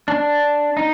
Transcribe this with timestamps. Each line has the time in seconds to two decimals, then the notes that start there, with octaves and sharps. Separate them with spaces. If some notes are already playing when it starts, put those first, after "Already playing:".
0.08 D4
0.77 D#4